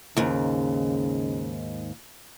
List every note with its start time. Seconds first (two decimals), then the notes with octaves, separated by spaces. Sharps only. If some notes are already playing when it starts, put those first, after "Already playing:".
0.17 D#2 G#2 C#3